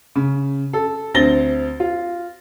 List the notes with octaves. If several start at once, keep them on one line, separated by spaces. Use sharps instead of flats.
C#3
A4
D2 C4 A6 A#6 G7
F4